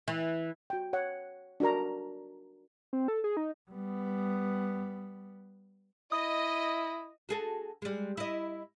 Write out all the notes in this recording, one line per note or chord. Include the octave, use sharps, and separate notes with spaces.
E3
F#4 G5
C#5 F#5
D4 F#4 A#4 A#5
C4
A4
G#4
D#4
G3 B3
E4 D#5 D#6
F#4 G#4 A4
G3 G#3
E4 D#5